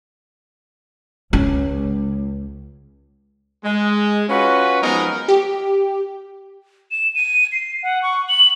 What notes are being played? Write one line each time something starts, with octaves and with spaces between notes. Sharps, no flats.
C#2 C#4
G#3
C#4 F4 F#4 B4
F3 F#3 G#3 B3 D#4 A#4
G4
E7
D#7
C7
F#5
C#6
F#7